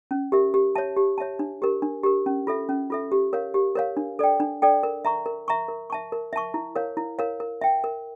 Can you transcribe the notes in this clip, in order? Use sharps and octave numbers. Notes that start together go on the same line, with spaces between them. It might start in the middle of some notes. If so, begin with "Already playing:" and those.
C#4
G4 A#4 E5
G4
C#5 E5 A5
G4
C#5 E5 A5
D4
G4 A#4
D4
G4 A#4
C#4
F4 A4 E5
C#4
F4 A4 E5
G4
A#4 C#5 F5
G4
A#4 C#5 F5
D4
A4 D5 G5
D4
A4 D5 G5
A#4
E5 A#5 C#6
A#4
E5 A#5 C#6
A#4
E5 A5 C#6
A#4
E5 A5 C#6
E4
A#4 C#5 F5
E4
A#4 C#5 F5
A#4
E5 G5
A#4